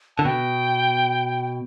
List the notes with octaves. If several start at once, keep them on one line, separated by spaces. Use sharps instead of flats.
D3 A5
B2 G5